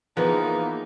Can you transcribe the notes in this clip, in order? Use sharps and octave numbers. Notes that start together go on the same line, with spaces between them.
E3 F3 A#3 B3 D#4 G#4 A#4 B4